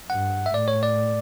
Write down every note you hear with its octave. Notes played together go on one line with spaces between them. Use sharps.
G2 F#5
E5
A2 D5
C#5
D5